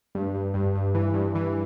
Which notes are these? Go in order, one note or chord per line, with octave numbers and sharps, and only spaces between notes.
G2
G2
G2
G2
E3
G2
E3